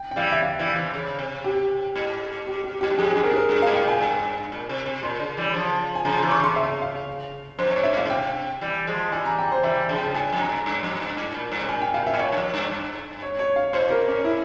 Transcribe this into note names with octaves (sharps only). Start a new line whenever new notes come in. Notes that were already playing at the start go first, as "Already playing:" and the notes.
Already playing: G5
G5
E3 G3 F5
E5
F5
E3 G3
C3 E3
C#3
C3
G4
G#2
G4
G4
G#2 G4
G2
F2 G#4
F2 G#4
G2 A#4
G#4
A#4
G2 G#4
G#2 F5
G5
A#2
G#5
G2
A#2
C3
C3
A#2 C6
C#3
E3 G3
C#3 F3
G#5
C#3 F3 A#5
C3 E3 C6
C#6
C#3 C6
E5
F5
F2 C5
G2 C#5
E5
G#2 F5
C#3
C3 G5
E3 G3
F3 G#3
E3 G3 G#5
A#5
G5
C5
E3 G3 E5
C#3 F3
G5
G2 G#5
F2
A#5
G2
G2
F2
G2
G#2
A#2
G2
C3
A#2 G#5
G5
A#2 F5
E5
G#2
A#2 C#5
G2
F2
G2
G2
C#5
C#5
F5
G#2 C5
A#4
C#4
E4